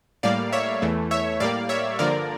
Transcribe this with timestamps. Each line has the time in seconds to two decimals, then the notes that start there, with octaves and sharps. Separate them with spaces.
0.23 A2 G3 A#3 D5 F5
0.53 C#5 E5
0.82 E2 E3 A3
1.11 C#5 E5
1.40 A2 G3 A#3 D5 F5
1.69 C#5 E5
1.99 G2 D3 F3 A#3 A#4 D5